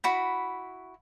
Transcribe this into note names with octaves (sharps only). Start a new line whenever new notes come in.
E4 F#4 B5